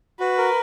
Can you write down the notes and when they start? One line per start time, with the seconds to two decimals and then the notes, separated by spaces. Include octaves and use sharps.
0.20 F#4 B4
0.38 A#4